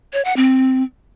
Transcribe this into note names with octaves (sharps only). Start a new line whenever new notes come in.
C#5
F#5
C4